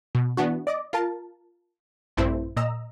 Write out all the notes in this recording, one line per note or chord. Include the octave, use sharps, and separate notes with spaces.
B2
E3 B3 D4 F#4
D5 D#5 D6
F4 A#4 A5
A#1 G2 A3 C4 E4 C5
A#2 D#5 A#5 E6